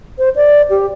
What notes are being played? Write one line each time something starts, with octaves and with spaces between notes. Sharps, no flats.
C5
D5
G4